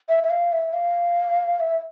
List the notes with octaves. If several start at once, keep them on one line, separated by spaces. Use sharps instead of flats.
E5
E5
F5
E5
F5
E5